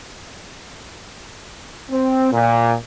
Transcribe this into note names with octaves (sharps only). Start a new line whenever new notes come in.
C4
A#2